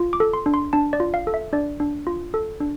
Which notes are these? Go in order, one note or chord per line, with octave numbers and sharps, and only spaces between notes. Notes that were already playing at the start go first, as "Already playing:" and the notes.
Already playing: F4
D6
A4
C6
D4
C6
D4 A5
D5
F4
F5
A4
E5
D4 D5
D4
F4
A4
D4